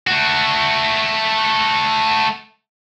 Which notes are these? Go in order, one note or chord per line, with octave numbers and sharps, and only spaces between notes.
A3 F#4